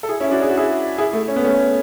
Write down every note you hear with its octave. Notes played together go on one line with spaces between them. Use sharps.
A4
E4 G#4
C#4 E4
D4 F#4
G#4
F#4
E4 G#4
E4 G#4
A3
C#4
B3
A3 C#4